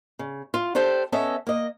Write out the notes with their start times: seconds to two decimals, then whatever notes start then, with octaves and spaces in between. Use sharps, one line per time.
0.19 C#3
0.54 F4
0.75 D4 G4 A4 C5 G5
1.12 B3 C#4 A4 D#5 E5
1.47 A#3 D#5